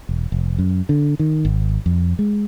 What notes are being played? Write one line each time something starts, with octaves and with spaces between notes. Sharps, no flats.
E1
F1
F#2
D3
D#3
G#1
F2
G#3